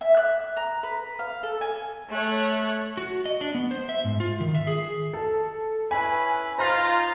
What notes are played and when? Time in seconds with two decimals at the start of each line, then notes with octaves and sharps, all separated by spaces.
0.01 E5
0.17 F#6
0.57 A#5
0.83 B4
1.19 F5
1.43 A4
1.61 G#5
2.12 A3 C#5 F#6
2.97 F#4
3.26 D#5
3.41 D4
3.55 B3
3.71 C5
3.89 E5
4.04 G#2
4.20 F4
4.41 D#3
4.55 E5
4.67 G#4
5.13 A4
5.91 C#4 E4 B4 G#5 B5
6.58 D#4 F4 C5 A#5 F6